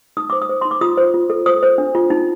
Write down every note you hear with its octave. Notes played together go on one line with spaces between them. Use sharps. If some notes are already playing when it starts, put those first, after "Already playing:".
D#4 D#6
C5 D6
D#6
C5
D#4 C6
D6
F4 D#6
C5
F4
A4
C5 D#6
C5
D4
F4
D#4